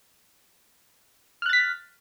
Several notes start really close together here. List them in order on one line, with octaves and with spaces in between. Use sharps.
F6 F#6 A6 B6